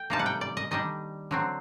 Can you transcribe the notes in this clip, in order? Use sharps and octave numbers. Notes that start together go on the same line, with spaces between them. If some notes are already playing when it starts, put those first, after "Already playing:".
Already playing: G5
C3 G3 A#3 D#4 A5
F#5
G5
D5
D#5
D#3 G3 D4 D#5
D3 F#3 C4